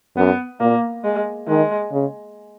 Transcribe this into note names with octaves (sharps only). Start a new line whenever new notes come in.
F#2 B3
A#2 A#3
G#3
D#3 G#3
C#3